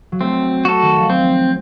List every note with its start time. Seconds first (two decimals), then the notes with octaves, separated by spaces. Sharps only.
0.12 F#3
0.20 A3 C4
0.65 F#4 A4
0.82 D#3
0.96 F3
1.09 F#3 C4